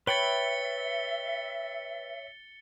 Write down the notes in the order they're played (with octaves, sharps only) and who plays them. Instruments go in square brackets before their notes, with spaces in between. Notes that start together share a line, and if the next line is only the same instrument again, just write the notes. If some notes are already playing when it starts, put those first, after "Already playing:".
[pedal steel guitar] B4 G5 B5 [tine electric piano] C#5 [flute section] E5 [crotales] A6 C#7 G7